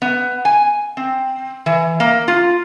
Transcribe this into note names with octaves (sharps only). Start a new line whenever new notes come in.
B3
G#5
C4
E3
A#3
F4